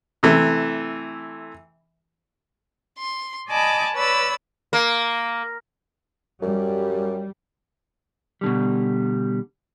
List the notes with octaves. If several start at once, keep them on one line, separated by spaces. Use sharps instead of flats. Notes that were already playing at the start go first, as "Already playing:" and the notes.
C3 E3 A3
C6
D5 D#5 G#5 A5 B5 D6
B4 C#5 D5 B5 E6
A#3
F#2 G3
B2 D3 G3